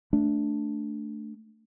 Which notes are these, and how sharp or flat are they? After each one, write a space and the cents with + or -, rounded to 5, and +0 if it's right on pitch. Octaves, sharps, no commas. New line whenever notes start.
A3 +0 D4 -5